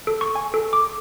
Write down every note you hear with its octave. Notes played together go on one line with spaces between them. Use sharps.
A4
C#6
G#5
A4
D6